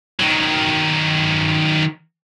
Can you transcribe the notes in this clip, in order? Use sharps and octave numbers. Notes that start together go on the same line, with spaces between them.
D#3 F#3